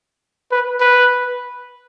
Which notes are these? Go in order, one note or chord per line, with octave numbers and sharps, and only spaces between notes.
B4
B4